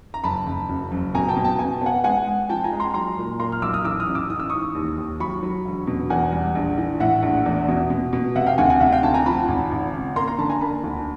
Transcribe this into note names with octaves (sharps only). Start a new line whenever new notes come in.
A#5
F#1 A5 B5
F#1
F#2
F#1
B2 G#5 A#5
G5 A5
B2
G5 A5
B2 G#5
A5
B3 F#5 G#5
G#3 F#5 G#5
G#3
F3 G5 A5
G#5 A#5
G#3
A#5 C6
F#3 A#5 C6
A#2
A#2 A#5 C6
F6
B1 D6 E6
D#6 F6
E3 D6 E6
D#6 F6
A1
D6 E6
E3 D#6
E6
G#2 C#6 D#6
D#2
D#2
F#3 B5 C#6
F#3
E1
B2
E2 F#5 G#5
G3
A#1
E3
A2 E5 F#5
A#1
E2
B2
B2
B2
C3 E5 F#5
F5 G5
D2 F#5 G#5
F#5 G#5
C3 E5 F#5
F5 G5
D2 G5 A5
G#5 A#5
F3 A5 B5
G#1
G#1
C#3
A#3 A#5 C6
A#5 C6
D3 A5 B5
G#5 A#5
A#3 A5 B5
D2